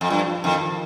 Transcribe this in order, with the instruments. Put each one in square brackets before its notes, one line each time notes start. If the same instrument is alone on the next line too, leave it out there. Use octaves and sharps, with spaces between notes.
[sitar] F2
[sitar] G2 [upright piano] F3
[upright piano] F3
[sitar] F2 [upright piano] D#3
[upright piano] F3